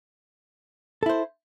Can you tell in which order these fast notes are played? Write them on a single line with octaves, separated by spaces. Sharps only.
A4 E4 C5